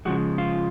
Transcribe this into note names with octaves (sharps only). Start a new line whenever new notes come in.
C#3 F3 G#3 F#4
F4